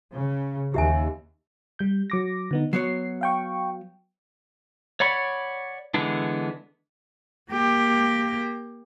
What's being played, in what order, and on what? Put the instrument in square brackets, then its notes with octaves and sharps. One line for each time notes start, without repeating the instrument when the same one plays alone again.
[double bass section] C#3
[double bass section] D#2 [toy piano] G4 E5 G#5
[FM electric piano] G3 G6
F#3 D6 A#6
D3 B3 D#4
[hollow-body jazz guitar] F#3 B3 C#5 [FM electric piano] C7
[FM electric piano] F5 G5 C#6
[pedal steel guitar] C#5 D5 F#5 B5 C#6
D3 E3 G#3 B3 D4
[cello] A#3 G4